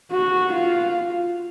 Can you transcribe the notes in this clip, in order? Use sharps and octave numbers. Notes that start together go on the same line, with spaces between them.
F#4
F4